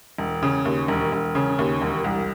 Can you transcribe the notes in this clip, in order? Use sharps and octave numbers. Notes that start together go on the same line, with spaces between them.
E1
C#3
D#2
E1
E1
C#3
D#2
E1
C2